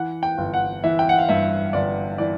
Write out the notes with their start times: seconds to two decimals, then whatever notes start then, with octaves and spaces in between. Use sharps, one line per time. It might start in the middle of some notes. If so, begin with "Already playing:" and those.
Already playing: E3 F#5
0.23 G5
0.38 G1
0.54 F#5
0.84 E3 E5
0.99 G5
1.09 F#5
1.18 F5
1.29 G2 E5
1.73 G1 D5
2.18 E3 D5